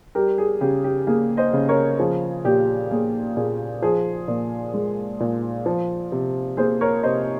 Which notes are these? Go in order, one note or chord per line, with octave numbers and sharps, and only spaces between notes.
G3 G4 A#4
G#4
C#3 G4
G4
A#3 G#4
C5 D#5
C#3
A#4 C#5
F3 G#4
A#2 G4
A#3 G#4
A#2 G#4
F3 G#4
A#2
G#3
A#2
F3
C3
A#3 G#4 C5
A#4 C#5
C3 C5 D#5